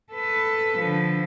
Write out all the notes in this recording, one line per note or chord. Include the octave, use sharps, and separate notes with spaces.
A4 B4
D3 F3